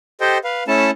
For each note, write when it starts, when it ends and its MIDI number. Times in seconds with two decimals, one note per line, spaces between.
0.21 0.38 67
0.21 0.38 69
0.21 0.38 72
0.21 0.38 75
0.21 0.38 79
0.44 0.64 71
0.44 0.64 77
0.68 0.91 57
0.68 0.91 61
0.68 0.91 64
0.68 0.91 69
0.68 0.91 81